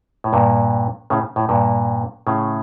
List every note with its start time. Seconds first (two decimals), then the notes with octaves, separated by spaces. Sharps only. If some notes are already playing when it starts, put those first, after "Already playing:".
0.24 A2
0.33 G2 A#2
1.10 A2 C#3
1.36 A2
1.49 G2 A#2
2.27 A2 C#3